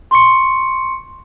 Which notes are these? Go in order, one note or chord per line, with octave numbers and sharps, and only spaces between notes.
C6 C#6 C#7